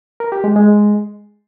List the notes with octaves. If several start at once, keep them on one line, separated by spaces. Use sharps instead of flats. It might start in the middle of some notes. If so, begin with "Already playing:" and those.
A#4
G4
G#3
G#3